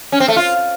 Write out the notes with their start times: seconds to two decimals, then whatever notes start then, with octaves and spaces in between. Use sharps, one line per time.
0.12 C#4
0.20 C4
0.28 A3
0.36 F4